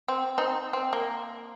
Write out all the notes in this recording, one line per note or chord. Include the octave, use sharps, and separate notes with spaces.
C4
C4 D#4
C4
A#3